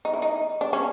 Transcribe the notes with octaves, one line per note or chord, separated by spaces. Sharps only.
D#4
E4
D#4
D4
C#4